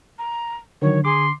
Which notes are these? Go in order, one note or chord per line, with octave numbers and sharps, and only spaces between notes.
A#5
D3 D#3 F#3 C#5
G#4 C6 D6